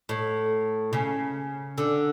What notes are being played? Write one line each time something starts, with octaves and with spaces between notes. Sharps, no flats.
A2
C#3
D3